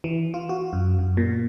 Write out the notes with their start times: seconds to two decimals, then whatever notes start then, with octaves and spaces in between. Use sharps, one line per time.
0.04 E3
0.34 F4
0.49 F#4
0.73 F#2
0.99 F#2
1.17 A#2